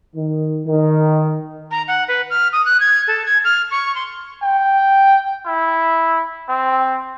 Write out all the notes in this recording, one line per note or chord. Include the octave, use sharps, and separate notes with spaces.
D#3
D#3
A#5
F#5
B4
F6
D#6
F#6
G#6
A4
G#6
F6
C#6
C6
G5
E4
C4